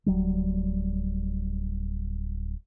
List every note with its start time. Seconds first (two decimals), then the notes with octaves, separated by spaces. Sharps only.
0.06 D1 F#3 G3